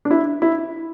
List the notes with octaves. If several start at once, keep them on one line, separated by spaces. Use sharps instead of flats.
D4
E4
E4